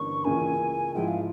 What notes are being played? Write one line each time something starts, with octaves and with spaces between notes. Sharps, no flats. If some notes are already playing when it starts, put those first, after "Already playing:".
Already playing: G1 G2 E3 A#3 C#4 C#6
C#2 C#3 E3 A#3 G#5
G#2 F3 G#3 E4 G5
F5